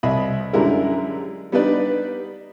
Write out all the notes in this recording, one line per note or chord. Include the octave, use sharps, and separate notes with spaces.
C2 D#5 E5 B5
F#2 D3 G3 G#3 E4 A#4
G3 B3 D4 D#4 B4 D5